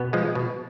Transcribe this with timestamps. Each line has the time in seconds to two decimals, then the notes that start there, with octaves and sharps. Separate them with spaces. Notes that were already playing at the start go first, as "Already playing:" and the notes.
Already playing: B2 B3
0.13 F3 G#3
0.35 B2